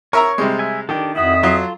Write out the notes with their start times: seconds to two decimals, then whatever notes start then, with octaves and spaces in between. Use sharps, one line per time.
0.13 A#4 C#5 E5 A#5
0.38 C3 G3 G#3
0.59 E5 G#5
0.89 D#3 D4 G4 A4
1.16 F2 E4 F#4 E5 D#6
1.43 F#3 F4 A4 C6